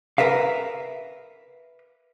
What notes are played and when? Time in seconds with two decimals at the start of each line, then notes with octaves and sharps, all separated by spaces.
0.18 A#4 B4 E5 F5